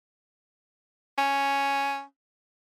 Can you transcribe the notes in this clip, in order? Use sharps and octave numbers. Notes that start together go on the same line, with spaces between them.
C#4